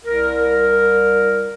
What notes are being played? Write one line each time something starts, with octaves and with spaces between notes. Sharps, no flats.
C2 A#4